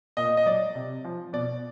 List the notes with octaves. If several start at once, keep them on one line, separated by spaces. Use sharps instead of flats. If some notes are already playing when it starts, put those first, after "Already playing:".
A#2 D#5
D#5
F#3 D5
C3
F3
B2 D5